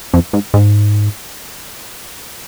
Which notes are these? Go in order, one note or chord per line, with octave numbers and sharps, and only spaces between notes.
F2
G#2
G#2